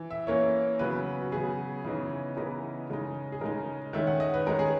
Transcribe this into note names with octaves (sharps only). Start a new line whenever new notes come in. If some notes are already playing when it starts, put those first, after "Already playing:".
Already playing: E3
E5
E3 A#3 C#4 C#5
C#3 F#3 B3 B4
F#4
C#3 F#3 B3 G#4
C#3 E3 B3 D#4
C#3 E3 B3 D#4 A#4
C#3 G#3 D#4
G#4
C#3 G#3 D#4 A#4
D#3 G#3 C#4 E5
F#5
D#5
B4
D#3 G#3 C#4 A#4
G#4